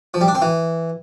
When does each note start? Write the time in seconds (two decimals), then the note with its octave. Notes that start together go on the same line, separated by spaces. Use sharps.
0.14 F3
0.21 G3
0.28 D4
0.35 C4
0.42 E3